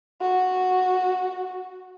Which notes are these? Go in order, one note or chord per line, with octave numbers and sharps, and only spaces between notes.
F#4